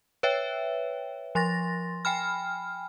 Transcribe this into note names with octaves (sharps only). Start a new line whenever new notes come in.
B4 C#5 E5 G5
F3 C6 A6 A#6
G5 G#5 B5 F6